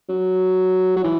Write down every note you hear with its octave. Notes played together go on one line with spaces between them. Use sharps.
F#3
F#3
E3